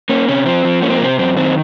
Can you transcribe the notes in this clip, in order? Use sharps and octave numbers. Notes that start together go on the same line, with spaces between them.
A#3 C#4
C3 C#4
F3 C4
F3
A#3 C#4
C4
A#3
C3 C4
F#2 C4
D#3 C4